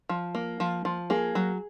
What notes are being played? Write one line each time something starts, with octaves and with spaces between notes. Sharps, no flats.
F3
A#3
F3
F3
A#3 G#4
F#3